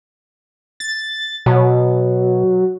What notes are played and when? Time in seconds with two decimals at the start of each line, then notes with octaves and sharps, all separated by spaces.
0.80 A6
1.46 B2 F#3